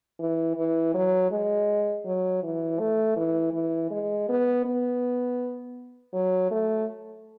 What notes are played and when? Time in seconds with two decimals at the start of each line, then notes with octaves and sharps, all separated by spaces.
0.20 E3
0.57 E3
0.94 F#3
1.32 G#3
2.06 F#3
2.43 E3
2.79 A3
3.16 E3
3.53 E3
3.91 G#3
4.29 B3
4.65 B3
6.13 F#3
6.51 A3